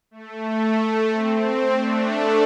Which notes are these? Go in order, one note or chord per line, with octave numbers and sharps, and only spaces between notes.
A3
C4
A3 D4